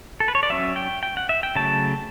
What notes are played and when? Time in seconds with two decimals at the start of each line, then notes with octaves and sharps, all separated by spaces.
0.20 A4
0.28 B4
0.35 C#5
0.43 D5
0.50 F#3 C#4 E5
0.76 G5
1.03 G5
1.17 F#5
1.29 E5
1.43 G5
1.56 C#3 F#3 A3 A5